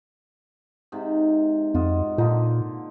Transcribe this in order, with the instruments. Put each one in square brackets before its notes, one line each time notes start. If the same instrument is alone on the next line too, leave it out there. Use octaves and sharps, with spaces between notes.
[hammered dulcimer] G#2 C3
[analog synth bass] F2 [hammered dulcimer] F4 F#4 D#5
[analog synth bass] A#2 [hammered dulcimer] D3 A#3 D#4